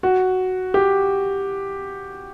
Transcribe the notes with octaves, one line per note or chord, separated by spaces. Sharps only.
F#4
G4